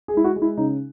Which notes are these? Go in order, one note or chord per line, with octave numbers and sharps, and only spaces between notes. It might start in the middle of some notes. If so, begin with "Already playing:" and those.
G#4
G#3 E4
F#4
G#3
E4
C#3 D#4